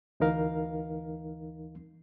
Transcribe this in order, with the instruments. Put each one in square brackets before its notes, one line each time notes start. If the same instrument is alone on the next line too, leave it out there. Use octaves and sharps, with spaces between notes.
[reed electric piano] D2 E3 D#4 A#4 F5